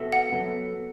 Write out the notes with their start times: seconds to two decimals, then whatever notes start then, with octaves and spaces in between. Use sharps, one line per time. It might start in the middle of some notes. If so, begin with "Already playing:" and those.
Already playing: B3 F#4 A4 E5
0.12 F#5
0.32 F#3 B3 A4